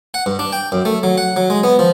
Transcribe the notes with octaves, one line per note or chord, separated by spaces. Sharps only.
F#5
G2
D4
G5
F#2
A3
F#3
F#5
F#3
G#3
B3
F3